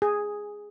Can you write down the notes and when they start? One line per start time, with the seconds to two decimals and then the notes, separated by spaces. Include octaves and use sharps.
0.02 G#4